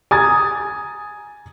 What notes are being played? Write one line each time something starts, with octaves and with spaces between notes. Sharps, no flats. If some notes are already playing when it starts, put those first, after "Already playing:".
G#5 A#5 D#6 G#6 A6